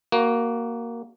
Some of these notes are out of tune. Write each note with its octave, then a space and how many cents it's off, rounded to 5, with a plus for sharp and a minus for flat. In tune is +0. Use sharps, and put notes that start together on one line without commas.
A#3 +0 F#4 +20